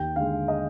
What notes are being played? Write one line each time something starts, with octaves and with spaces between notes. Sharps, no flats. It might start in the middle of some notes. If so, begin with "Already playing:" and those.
Already playing: D#2 G5
D3 G#3 F5
D#5